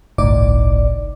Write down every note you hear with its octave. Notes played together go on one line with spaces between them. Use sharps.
G1 C2 A2 D#4 D5 D6